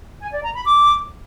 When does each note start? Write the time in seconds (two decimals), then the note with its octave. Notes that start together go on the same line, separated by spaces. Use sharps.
0.21 G#5
0.32 D5
0.43 A#5
0.54 B5
0.65 D6